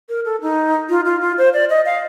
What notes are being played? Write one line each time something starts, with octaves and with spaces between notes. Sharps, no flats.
A#4
A4
D#4
F4
F4
F4
C5
D5
D#5
F5